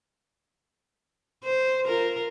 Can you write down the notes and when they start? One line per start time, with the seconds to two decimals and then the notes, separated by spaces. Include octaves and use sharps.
1.44 C5
1.86 F4 A#4